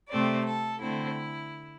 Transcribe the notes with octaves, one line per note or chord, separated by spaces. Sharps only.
C3 A3 C4 D5
A4
D3 A3 C4 E4